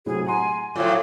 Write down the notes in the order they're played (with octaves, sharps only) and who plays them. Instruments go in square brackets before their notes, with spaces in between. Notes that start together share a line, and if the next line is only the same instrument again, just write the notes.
[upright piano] A2 C3 F#3 [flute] G#4
[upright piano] F#5 A#5 C6 [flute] G#5
[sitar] A2 F3 F#3 [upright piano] F4 [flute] D6